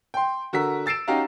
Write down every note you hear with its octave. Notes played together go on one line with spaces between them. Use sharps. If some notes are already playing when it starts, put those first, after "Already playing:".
G5 C6
D3 F#4 A#4 E6 B6
E6 A6 C7 D7 E7
C#4 D#4 F#4 G4 F5 A#5